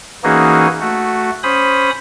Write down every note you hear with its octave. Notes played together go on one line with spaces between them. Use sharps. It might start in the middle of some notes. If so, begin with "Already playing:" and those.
E3 A#3 C#4 D#4 F#4 G#4
A3 F#4
C#4 C5 B5 D#6